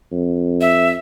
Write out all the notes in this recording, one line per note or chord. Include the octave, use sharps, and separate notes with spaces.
F2
E5